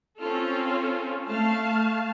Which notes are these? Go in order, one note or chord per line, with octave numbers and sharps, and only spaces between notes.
C4 C#4 F4 A4
A3 F5 A5